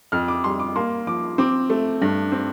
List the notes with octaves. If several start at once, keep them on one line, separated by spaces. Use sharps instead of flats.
F2 F6
D6
G3 C6
D6
A#3 C6
F3 D6
C4 D6
A3
G2
C4